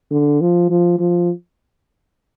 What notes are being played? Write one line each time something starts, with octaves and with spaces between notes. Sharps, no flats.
D3
F3
F3
F3